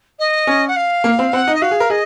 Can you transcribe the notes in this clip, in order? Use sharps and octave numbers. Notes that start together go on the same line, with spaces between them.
D#5
C#4
F#5
F5
A#3
C4
C4 F#5
D#4
D#5
F#4 F5
G#4
A#4
G#4 D#5